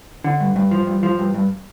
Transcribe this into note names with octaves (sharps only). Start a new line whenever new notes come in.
D3
G2
G2
F3
G2
F3
G2
G2